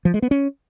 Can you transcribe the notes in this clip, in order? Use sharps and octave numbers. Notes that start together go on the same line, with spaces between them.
F3
G#3
B3
C#4